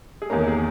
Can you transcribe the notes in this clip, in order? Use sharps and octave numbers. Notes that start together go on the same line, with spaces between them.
G#4
E2 D#3 A#3 C#4 A#4
G#4